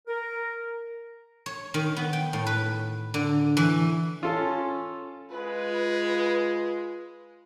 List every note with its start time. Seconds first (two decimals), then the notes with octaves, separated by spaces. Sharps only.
0.08 A#4
1.46 C#5
1.74 D#3
1.97 B3
2.13 G5
2.33 A2
2.47 B4
3.14 D3
3.57 E3
4.23 C#4 F4 A4
5.31 G#3 F4 B4